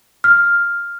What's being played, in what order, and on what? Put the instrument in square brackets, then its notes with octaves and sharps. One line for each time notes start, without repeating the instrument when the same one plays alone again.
[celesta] F6